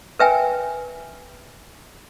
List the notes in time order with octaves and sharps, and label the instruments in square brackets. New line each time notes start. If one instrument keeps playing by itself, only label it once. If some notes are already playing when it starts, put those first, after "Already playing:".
[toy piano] A#4 B4 E5 G5 G#5